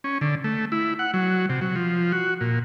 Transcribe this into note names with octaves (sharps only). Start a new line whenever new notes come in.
C#4
D3
A3
E4
F#5
F#3
C3
F#3
F3
F#4
A#2